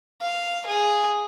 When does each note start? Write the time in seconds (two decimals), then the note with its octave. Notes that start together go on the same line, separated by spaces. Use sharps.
0.22 F5
0.66 G#4